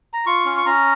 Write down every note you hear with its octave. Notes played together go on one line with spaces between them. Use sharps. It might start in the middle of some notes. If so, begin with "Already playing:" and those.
A#5
F4 C#6
C#4
C#6
C#4 A#5